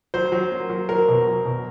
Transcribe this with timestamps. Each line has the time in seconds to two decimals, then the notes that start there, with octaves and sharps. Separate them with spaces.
0.14 F#3 C5
0.32 F#3
0.51 A#3
0.70 F#3
0.89 F#3 A#4
1.08 B2
1.27 F#3
1.45 B2